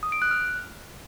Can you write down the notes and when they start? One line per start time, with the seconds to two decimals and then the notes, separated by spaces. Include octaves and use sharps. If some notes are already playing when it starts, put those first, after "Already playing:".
0.03 D#6
0.12 D7
0.22 F#6
0.31 F6